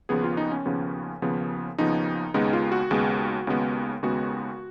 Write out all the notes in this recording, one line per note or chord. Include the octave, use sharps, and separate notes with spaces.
D#2 C#3 F3 B3 G#4
F4
D#4
C#4
D#2 C#3 F3 B3
D#2 C#3 F3 B3
D#2 C#3 F3 B3 D#4
D#2 C#3 G#3 B3 D#4
F4
F#4
D#2 C#3 G#3 B3
D#2 C#3 G#3 B3
D#2 C#3 G#3 B3 F#4